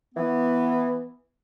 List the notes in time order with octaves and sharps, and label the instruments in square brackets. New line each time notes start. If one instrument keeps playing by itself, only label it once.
[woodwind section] E3 B3